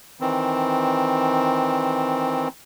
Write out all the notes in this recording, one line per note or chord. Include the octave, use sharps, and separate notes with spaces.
D#3 E3 C4